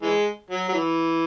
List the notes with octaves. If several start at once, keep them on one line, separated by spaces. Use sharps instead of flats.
E3 G#3
F#3
F#3
E3